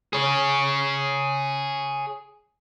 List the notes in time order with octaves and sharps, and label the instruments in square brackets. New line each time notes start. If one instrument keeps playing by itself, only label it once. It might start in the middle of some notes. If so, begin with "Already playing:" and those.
[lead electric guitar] G#4 C#5